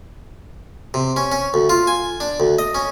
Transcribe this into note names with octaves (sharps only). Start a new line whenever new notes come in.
C3
C#4
C#4
D2
F4
G#5
D4
D2
D#5
C#4